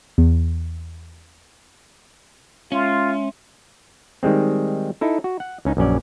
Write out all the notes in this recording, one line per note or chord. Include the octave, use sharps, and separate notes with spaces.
E2
G#3 C#4 F4 E5 C6
D#3 G3 G#3 C4
D#4 E4 A4
F#4
F#5
C#2 C#4 D#4
A#1 F#2 C#4 D5